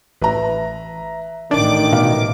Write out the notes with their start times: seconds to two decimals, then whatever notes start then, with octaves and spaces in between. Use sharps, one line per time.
0.22 A1 B4 E5 A#5
1.51 A1 D#3 D4 D5 D6
1.92 B2 F5